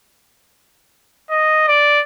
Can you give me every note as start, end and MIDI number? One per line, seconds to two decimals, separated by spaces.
1.30 1.64 75
1.68 2.01 74